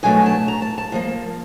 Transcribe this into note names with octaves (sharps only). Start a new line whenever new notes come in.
B2 F#3 A3 D4 G#5
A5
A#5
A5
A5
A2 F3 A#3